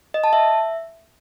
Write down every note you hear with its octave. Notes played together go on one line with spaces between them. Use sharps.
D#5
A5
E5